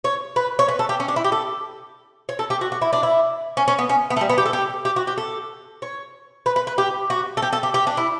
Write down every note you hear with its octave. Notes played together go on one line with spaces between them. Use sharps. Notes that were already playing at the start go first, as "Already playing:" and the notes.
C#5
B4
C#5
B4
A4
G4
C#4
D4
E4
G4
A4
C#5
A4
G4
F#4
F#4
E4
D4
E4
C#4
C#4
B3
C#4
B3
A3
G3
B3
G4
A4
G4
G4
F#4
G4
A4
C#5
B4
B4
B4
G4
F#4
A4
G4
A4
G4
G4
D4
E4